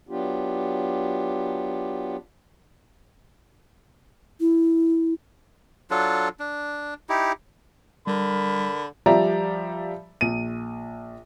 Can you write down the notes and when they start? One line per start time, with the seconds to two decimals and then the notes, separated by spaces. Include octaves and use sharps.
0.09 F#3 B3 D4 F4 G4
4.40 E4
5.91 F#3 D4 F4 A4
6.40 D4
7.09 D#4 E4 G4
8.07 D3 G3 A#4 B5
9.06 F3 G3 G4 D5 E5 A#5
10.21 A#1 D#7